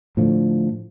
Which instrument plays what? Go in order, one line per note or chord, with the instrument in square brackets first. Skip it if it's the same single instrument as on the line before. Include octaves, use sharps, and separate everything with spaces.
[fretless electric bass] A2 D3 F3